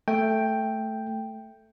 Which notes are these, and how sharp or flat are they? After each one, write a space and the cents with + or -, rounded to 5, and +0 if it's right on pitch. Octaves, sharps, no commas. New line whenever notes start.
A3 +0 G5 +0